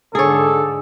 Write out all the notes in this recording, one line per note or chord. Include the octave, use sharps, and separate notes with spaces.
G#2 D3 G#4 A4 C#5